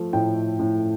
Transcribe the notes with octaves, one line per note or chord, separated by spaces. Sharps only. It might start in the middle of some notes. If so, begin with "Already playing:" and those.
Already playing: F3 A3
A2 G5
A2